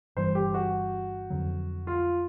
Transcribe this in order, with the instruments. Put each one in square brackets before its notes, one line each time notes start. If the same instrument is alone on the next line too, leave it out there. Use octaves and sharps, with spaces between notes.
[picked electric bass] G1 G2 E3 G3 [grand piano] C5
[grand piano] G4
F#4
[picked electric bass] F2 D3 F#3
[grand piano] F4